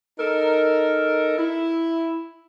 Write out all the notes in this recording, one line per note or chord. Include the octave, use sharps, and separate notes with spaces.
D#4 A4 A#4
E4